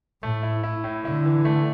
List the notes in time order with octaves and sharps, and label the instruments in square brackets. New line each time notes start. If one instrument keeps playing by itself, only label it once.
[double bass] A2 [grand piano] A3
[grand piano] E4
E4
A2
[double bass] D3 [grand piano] E4
[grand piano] E3
A3